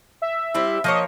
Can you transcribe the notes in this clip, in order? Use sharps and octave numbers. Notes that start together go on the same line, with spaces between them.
E5
G3 C4 E4
F3 A#3 C#5 D#5